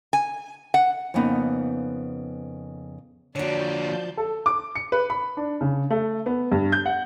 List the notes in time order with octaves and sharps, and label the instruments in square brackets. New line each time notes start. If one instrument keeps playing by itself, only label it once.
[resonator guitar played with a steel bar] G#5
F#5
[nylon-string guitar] F2 C#3 A#3 B3 D#4
[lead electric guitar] D3 A#3 [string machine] F3 A5 G6 [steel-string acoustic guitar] F#4 C#5 [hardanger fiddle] D5
[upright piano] A4
D6
C#7
B4
B5
D4
C#3
A3
B3
G2
G6
F#5